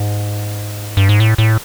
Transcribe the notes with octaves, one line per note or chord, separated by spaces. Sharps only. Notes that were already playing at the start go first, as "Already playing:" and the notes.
Already playing: G#2
G2
G#2
A2
A2